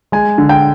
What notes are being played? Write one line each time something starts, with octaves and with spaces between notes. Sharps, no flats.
G#3 G#5
D3
G5